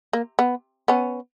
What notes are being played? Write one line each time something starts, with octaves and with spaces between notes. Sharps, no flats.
A#3
B3
B3 C#4